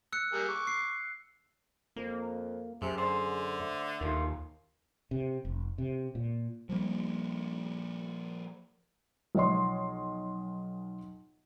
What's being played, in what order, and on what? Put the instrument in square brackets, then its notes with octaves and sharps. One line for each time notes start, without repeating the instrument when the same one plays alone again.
[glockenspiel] E6 F#6 C#7
[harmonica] G3 A#3 G#4
C#6 D6
[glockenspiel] C7
[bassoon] F2 [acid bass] A#3
[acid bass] F#2 [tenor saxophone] C3 [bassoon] G#4
[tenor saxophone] D3 [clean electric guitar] C5
[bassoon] A3
[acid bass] D#2 [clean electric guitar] D#3 F4
[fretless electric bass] C3
F1
C3
A#2
[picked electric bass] F3 G3 A#3
[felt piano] B1 F3 C#5 D#5 C6